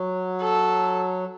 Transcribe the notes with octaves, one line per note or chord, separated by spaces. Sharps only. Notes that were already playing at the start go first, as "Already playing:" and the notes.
Already playing: F#3
A4